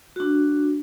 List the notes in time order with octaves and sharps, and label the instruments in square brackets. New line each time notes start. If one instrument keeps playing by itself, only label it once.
[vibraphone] D4 F#4